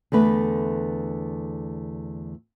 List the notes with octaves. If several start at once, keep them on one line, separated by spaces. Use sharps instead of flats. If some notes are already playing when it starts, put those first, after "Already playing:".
E2 D3 A3 B4